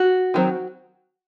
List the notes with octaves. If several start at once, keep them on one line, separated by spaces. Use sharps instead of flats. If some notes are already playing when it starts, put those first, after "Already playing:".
Already playing: F#4
D#3 F#3 C4